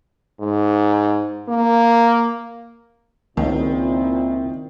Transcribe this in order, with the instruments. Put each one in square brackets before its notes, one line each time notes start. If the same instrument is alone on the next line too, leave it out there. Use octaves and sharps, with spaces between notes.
[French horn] G#2
A#3
[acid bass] C#2 [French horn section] A#2 C4 E4 [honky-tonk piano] D#3